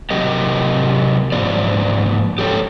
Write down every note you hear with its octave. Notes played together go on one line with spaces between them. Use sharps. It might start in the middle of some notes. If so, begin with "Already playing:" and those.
C3 F#3 G4 A#4 D#5
G#2 F3 A#3 D5
G4 A4 C5 C#5 G5